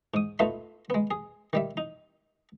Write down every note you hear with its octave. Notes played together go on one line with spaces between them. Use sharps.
G#2 D#6
A3 B3 D#4 F4 F#4 E5
G#3 B3
G#4
D#3 G3 E5
D#4